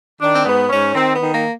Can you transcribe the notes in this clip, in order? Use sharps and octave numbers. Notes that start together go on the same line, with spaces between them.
D#3 D4
C4
G#2 B3
G#2 C#4
D#3 C4
B3
D#3
A#3